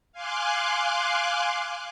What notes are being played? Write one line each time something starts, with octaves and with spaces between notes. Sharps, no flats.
F5 G#5 C6 D6 F#6